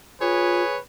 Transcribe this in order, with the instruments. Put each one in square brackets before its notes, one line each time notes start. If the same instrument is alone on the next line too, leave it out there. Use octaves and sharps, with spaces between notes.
[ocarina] F4 [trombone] G#4 [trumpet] B4 [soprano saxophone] C#5